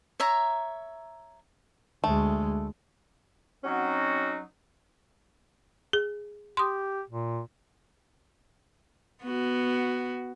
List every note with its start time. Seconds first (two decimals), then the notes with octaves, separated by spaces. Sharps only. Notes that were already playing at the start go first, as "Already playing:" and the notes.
0.20 C#5 E5 A#5
2.04 D2 G#3 A3
3.64 F#3 C4 C#4 D#4 F#4
5.93 G#4
6.57 G4 C6 D#6
7.09 A#2
9.24 B3 F#4